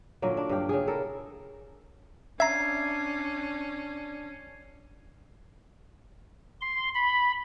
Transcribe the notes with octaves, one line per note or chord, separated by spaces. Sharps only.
A#2 D3 F#3 A#3
D4
G2 F5 G5
C#3 G#4
E4 A4 A#4
C#4 D4 E5 A#5 G#6 C7
C6
B5